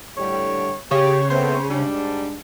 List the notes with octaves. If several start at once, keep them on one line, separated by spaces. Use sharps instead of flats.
A2 D3 G3 C#5
C#3 G4 C#5
A3 B3 C4 C5
G#2 G3 D4